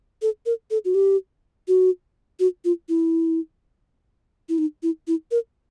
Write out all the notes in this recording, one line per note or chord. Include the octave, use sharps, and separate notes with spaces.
A4
A#4
A4
F#4
G4
F#4
F#4
F4
E4
E4
D#4
E4
E4
A#4